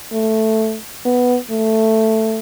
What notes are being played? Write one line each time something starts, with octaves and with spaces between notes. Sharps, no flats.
A3
B3
A3